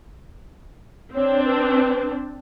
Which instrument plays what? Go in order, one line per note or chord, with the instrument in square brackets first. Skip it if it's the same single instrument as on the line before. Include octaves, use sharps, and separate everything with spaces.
[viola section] C4 D4 [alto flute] C#5
[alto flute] B4